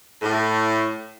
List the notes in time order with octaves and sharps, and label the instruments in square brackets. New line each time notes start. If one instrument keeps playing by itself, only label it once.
[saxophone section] A2